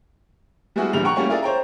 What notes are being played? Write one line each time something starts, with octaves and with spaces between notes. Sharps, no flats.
G3 G#3 B3 E4 F#4 G#4
A#1 E2 D3 G3 F7
F#5 G5 A#5 C#6
G3 A3 A#3 C#4 E4 F#4
E4 F4 G#4 A#4 D5 E5
C5 C#5 G5 A#5